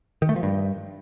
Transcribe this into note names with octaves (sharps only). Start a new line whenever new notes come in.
D#3
A3
F3
G2